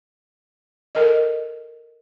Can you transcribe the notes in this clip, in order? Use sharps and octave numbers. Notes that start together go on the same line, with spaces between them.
A4 A#4 D#5